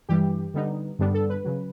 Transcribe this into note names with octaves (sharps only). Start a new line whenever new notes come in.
G2 E3 G3 G4
D3 G3 B3 D#4
G2 D3 G3 B3 D4
A4
B4
C#3 F#3